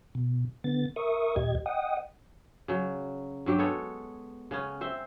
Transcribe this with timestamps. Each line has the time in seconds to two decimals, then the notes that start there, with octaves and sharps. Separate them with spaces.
0.15 B2
0.64 D3 B3 A6
0.96 A#4 E5 C#6 D#6
1.36 D#2 A#2 G4 D#5 G#6
1.66 D#5 F#5 G5 D#6
2.68 C#3 F#3
3.46 G2 F#3 G4
3.58 G#3 B3 A4 C#5
4.51 C#3 B3 C#4
4.81 C4 C5 E5